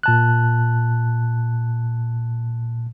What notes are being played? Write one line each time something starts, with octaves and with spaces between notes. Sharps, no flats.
A#2 A5 F#6